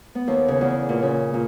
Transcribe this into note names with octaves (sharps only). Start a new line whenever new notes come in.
B3
D#2
C#3
E2
A#2
C#3
A#2